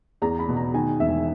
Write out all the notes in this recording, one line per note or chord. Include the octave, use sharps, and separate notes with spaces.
E2 A#5
B5
B2
A#5
D#3 G#5
E1 E5